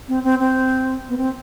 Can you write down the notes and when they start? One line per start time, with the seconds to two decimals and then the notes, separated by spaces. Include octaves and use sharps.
0.08 C4
0.24 C4
0.40 C4
1.09 B3
1.18 C4